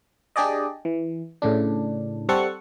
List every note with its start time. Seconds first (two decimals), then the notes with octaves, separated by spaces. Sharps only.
0.36 D4 G4 G#4 D5 D#5
0.85 E3
1.42 A2 C#3 D4
2.29 G3 C4 A4 F#5 C#6